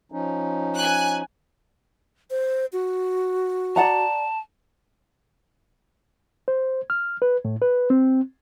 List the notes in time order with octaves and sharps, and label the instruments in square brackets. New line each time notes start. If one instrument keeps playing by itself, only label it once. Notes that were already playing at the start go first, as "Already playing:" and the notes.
[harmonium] F3 C#4 D#4
[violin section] G#5 F#6
[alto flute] C5
F#4
[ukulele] D5 F#5 A#5 [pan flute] A5
[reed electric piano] C5
F6
B4
A2
B4
C4